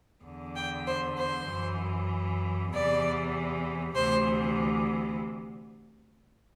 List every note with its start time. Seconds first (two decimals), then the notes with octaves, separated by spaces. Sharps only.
0.24 E2 D3
0.56 G5
0.86 C5
1.17 C5
1.47 F#2 E3
2.71 E2 C3 E3 D5
3.95 D2 C3 E3 C5